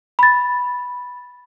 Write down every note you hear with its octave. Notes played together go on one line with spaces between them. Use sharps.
B5 A6